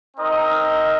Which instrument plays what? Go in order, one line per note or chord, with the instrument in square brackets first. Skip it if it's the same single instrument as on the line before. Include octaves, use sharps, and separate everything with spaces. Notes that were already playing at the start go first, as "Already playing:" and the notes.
[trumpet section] C4 D#4 A#4 D#5